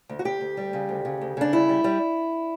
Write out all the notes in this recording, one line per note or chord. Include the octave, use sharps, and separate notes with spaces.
D2
F#4
D2 G4
D2
G3
C#3
D2
C#3
D2
C#3 D4
G3 E4
G3
G3